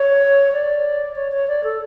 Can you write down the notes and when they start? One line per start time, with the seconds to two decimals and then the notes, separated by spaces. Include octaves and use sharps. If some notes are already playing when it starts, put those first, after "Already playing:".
Already playing: C#5
0.53 D5
1.16 C#5
1.32 C#5
1.48 D5
1.64 A4